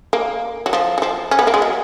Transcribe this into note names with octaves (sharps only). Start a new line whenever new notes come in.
A#3
F#3
F3
F#3
F3
C#4
B3
A#3
G#3
F#3